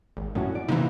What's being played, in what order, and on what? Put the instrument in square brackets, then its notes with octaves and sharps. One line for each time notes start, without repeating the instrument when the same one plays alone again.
[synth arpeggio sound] G#1
[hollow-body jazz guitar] F#2 C#4 F#4 [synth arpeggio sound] A2
[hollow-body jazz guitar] D5
[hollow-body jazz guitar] C3 [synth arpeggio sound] E3 A#3 D#4